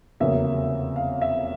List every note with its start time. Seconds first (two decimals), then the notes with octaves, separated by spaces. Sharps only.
0.20 F1 E2 C#3 F#3 A#3 E5
0.96 F5
1.22 E5